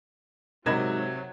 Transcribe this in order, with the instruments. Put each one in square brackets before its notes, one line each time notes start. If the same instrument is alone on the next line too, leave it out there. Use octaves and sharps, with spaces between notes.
[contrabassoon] G#2 [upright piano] C3 G#6 E7 [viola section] F#3 [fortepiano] A#4 D#5 B5